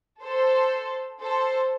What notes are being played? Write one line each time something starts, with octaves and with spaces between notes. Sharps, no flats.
A4 C5
A4 C5